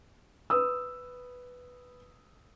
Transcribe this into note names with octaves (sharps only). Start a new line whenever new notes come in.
B4 D#6 E6